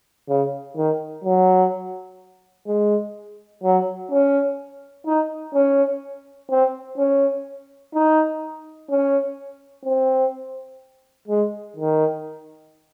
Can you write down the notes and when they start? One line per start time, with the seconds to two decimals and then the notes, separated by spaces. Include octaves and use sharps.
0.29 C#3
0.76 D#3
1.24 F#3
2.67 G#3
3.64 F#3
4.11 C#4
5.06 D#4
5.55 C#4
6.50 C4
6.98 C#4
7.94 D#4
8.90 C#4
9.86 C4
11.28 G#3
11.76 D#3